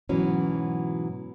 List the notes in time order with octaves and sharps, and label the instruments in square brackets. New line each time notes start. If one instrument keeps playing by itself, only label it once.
[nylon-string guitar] G#2 B2 E3 F#3 C#4